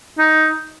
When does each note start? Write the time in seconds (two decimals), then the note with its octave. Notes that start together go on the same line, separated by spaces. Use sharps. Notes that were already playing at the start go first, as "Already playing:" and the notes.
0.18 D#4